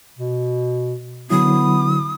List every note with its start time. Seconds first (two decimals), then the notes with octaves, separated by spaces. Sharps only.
0.18 B2
1.30 D3 F#3 B3 E4 D#6